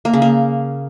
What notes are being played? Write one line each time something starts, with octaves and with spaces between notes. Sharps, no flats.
A#3
C#3
A#3